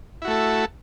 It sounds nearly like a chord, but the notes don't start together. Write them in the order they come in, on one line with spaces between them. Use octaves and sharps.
E4 F#4 A3 A4